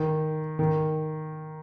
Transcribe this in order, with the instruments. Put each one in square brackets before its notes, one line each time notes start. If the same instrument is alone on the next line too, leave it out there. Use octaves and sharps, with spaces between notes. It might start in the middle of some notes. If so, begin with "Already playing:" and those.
Already playing: [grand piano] D#3
D#3